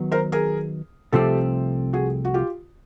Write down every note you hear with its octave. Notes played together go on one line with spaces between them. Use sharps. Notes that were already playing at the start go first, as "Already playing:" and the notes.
Already playing: D#3 F#3 B3 D#4
A#4 C5
G#4 A#4
C2 C3 F3 A3 C4 G4 A4
F#4 G#4
F#4
F4 G4